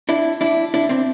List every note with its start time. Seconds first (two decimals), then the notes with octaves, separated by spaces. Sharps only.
0.09 D4 E4
0.41 D4 E4
0.74 D4 E4
0.89 C4 D4